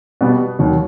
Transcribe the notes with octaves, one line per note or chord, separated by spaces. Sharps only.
B2 G3 B3
D#2 D#3 F#3